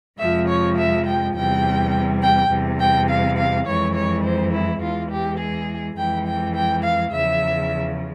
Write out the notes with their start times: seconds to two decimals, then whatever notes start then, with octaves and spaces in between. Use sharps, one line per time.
0.19 F2 C3 F3 G#3 E5
0.48 C#5
0.77 E5
1.06 G5
1.35 E2 C3 G3 G5
2.22 G5
2.50 E2 C3 G3
2.80 G5
3.09 F5
3.37 F5
3.66 F2 E3 G#3 C#5
3.95 C#5
4.23 C5
4.52 E4
4.82 E2 E3 G#3 F4
5.11 G4
5.39 G#4
5.97 F2 E3 G#3 G5
6.27 G5
6.55 G5
6.84 F5
7.13 E2 C#3 F3 E5